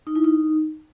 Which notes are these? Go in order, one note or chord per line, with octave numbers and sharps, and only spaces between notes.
D#4
E4
D#4